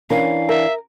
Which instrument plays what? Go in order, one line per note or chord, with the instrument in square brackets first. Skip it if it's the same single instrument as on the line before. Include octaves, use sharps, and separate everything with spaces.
[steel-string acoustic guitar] E3 C#4 D4 [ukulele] A#4 [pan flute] F5
[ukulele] A#4 [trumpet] E5